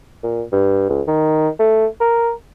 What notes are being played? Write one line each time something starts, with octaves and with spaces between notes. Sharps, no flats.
A#2
G2
C#2
D#3
A3
A#4